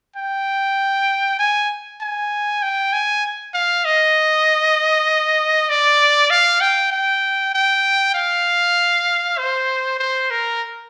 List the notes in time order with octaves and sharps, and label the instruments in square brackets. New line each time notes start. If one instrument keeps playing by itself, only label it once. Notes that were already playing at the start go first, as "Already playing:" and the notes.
[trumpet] G5
G#5
G#5
G5
G#5
F5
D#5
D5
F5
G5
G5
G5
F5
C5
C5
A#4